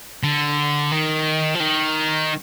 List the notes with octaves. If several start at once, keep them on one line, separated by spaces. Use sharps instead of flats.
D3
D#3
F3
D#3